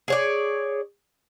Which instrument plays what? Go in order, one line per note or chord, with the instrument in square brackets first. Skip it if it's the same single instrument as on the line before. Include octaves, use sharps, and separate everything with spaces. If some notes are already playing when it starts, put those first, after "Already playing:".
[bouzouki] G#4 C#5 D5